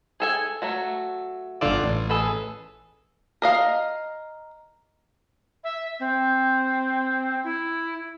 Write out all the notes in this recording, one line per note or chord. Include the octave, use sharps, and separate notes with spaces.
G#4 A4 G#5
F#3 A3 F#4
G1 D3 F4 A4 D5
A1
G#4 A4 B4
A#4 D#5 F5
E5
C4
E4